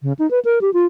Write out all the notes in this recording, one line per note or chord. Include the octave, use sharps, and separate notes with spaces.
C#3
D#4
B4
A#4
G4
F4